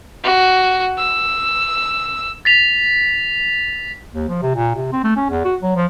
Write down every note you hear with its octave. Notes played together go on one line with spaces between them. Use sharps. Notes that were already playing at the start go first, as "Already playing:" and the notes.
F#4
E6
A6 B6 F7
D#2
F3
C3
A#2
C3
C4
A3
C#4
E2
F#4
F#3
F3